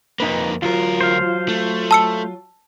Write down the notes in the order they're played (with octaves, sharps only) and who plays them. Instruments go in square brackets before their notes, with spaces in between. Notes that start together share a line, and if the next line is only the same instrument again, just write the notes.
[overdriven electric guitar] F2 A#3 [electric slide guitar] D#4 B4
[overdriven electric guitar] D2 A#4 [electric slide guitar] F#3 F4
[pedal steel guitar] C5 F5
[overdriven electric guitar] A3
[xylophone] A5 E6 C#7